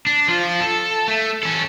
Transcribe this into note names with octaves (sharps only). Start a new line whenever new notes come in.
D4
F3 F4
A4
A3
C#4 A4